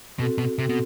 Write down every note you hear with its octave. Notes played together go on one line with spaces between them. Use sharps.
B2 C4 F#4 A4
B2
C3 C4 F#4 A4
B2